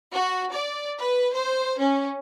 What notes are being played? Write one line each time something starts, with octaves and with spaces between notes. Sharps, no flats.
F#4
D5
B4
C5
C#4